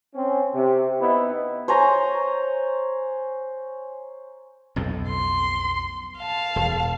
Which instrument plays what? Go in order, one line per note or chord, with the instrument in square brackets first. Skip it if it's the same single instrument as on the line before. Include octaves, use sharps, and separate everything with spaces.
[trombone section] C4 C#4
C3
B3 D#4 E4
[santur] C5 C#5 G#5 A#5
[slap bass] B1 F2 A2
[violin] C6
F5 A5
[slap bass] E1